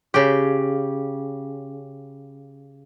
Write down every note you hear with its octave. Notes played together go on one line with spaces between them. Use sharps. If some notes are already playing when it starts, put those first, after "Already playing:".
C#3 G4